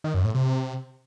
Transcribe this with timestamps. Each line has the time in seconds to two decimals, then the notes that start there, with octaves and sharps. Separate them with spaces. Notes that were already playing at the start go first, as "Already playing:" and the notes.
0.04 D#3
0.14 F#2
0.24 A2
0.35 C3